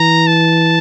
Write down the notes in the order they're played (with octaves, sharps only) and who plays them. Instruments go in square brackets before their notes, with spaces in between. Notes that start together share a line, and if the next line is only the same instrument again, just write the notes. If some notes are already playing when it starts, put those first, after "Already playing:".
Already playing: [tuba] E3 [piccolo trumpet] A#5
[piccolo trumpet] A5